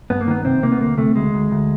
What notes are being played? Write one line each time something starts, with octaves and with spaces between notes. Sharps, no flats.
G2 B3
A#3
D#3 B3
C3 C4
C3 A#3
B3
D2 A#3
C3 A3
D2 G#3
D2
D2